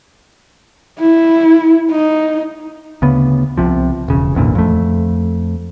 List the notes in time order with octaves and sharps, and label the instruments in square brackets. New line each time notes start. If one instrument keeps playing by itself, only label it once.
[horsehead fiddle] E4
D#4
[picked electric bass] D2 C#3 B3
C2 C3 F3
E1 C#3
G#1 E2 A#2 D3
F2 A3